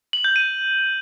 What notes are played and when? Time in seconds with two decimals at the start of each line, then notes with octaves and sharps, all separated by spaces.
0.13 F#7
0.24 G6
0.36 D#7